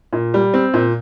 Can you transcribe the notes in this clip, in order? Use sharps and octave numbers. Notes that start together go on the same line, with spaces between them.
A#2
G3
C4
A#2